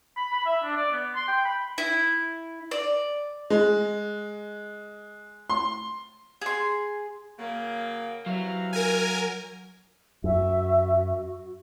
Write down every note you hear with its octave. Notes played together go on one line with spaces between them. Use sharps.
B5
B5
E5
D4
D5
B3
C6
G5
B5
E4
D5
G#3
C6
G#4 C6
C#3 F#3 A#3
C3 E3 F#3 F5
A#4 G#5
F#2 F#4 E5